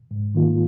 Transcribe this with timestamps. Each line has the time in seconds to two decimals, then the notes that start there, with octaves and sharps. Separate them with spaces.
0.11 G#2
0.35 D#3 A#3 F4